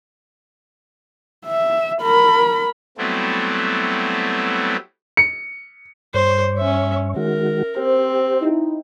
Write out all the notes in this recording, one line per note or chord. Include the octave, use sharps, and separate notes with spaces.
E5
A#4 B5
F#3 G3 A3 B3 C4 E4
C#7
G2 C5 C#5
C#4 E5
D#3 G#3 F#4 A#4
C4 G4 C5
D#4 E4